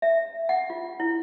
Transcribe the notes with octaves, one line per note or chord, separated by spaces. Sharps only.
E5
F#5
F4
E4